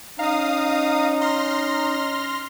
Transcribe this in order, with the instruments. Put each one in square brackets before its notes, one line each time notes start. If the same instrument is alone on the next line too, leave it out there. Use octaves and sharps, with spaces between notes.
[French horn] C#4 [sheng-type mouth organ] D#4 A#5 [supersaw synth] F5 D#6
[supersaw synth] C6 F6 A#6